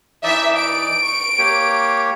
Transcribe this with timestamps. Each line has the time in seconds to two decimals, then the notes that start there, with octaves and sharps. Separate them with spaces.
0.24 E3 D#4 D5 E5
0.57 D7
1.02 C#6
1.39 A#3 G4 C#5